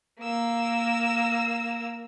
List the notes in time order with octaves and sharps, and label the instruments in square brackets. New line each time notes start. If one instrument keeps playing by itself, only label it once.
[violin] A#3 E6